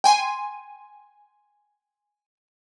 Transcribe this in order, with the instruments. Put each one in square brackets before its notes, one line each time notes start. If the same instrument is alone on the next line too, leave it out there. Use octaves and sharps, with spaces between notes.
[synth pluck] G5 G#5 C6 D#7